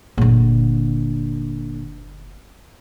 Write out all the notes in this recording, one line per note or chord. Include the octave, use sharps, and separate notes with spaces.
F#1 A#2 D3